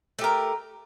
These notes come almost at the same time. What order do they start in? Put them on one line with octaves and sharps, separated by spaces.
A3 G4 A#4